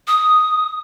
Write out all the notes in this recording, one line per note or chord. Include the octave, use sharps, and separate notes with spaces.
D#6